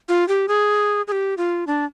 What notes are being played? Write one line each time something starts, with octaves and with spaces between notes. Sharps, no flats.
F4
G4
G#4
G#4
G4
F4
D4